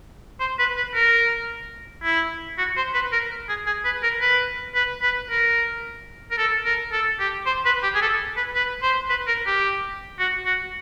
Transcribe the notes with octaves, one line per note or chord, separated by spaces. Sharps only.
C5
B4
B4
A#4
E4
F#4
C5
B4
A#4
G#4
G#4
B4
A#4
B4
B4
B4
A#4
A#4
A4
A#4
A4
G4
C5
B4
G4
G#4
A4
B4
B4
C5
B4
A#4
G4
F#4
F#4